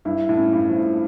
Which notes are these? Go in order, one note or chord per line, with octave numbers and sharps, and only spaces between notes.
G2 E4
A2
C#4
G2
F3
A2